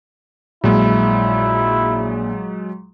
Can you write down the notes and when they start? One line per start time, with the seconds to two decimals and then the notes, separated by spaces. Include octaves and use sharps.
0.64 A#1 F#3 G#3 E4